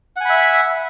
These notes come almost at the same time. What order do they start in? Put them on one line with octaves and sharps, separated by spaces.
F#5 G#5 B5 E5